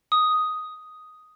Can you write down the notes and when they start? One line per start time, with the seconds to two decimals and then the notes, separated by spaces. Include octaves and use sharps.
0.12 D#6